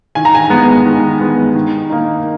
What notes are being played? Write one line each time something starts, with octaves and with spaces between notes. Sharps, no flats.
D#3 G#5
A#5
G#5
G#3 B3
D#3
G#3 B3
D#3
A#3 D#4